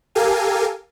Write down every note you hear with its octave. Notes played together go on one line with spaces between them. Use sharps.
G4 A4 A#4 F5 G#5